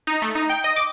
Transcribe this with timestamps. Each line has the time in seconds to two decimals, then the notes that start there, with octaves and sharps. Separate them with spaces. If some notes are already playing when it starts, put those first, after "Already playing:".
0.07 D#4
0.22 A3
0.35 D#4
0.49 G5
0.64 D#5
0.76 D6